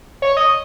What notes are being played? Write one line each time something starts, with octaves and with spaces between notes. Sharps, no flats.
C#5
D#5